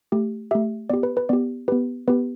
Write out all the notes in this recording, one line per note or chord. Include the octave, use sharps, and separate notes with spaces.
A3 G4
A3 G4 E5
B3 G4 D5
B4
B4
B3 G4 D5
B3 G4 B4
B3 G4 B4